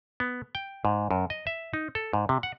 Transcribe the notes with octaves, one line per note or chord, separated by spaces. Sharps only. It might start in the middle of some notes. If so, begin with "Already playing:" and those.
B3
G5
G#2
F#2
D#5
E5
D#4
A4
G#2
C3
F#5